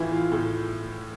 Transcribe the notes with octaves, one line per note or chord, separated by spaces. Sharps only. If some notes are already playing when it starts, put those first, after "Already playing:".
Already playing: A2 E3 E4 F4
F4
A2